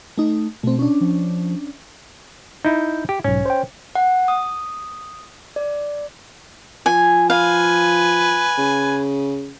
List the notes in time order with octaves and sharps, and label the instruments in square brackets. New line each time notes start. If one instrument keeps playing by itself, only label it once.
[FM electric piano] A3 D#4
[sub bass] B2 [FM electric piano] A3 C4
[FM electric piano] C#4 D4
[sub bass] F3
[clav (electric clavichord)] D#4 E4 [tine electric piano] G6
[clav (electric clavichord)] G4
[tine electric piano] B1 G#2 [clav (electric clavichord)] C#4
[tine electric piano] C5 G5
[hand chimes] F#5
D#6
D5
[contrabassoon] F3 [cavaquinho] G#5
[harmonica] B4 G#5 [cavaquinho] F5
[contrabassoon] C#3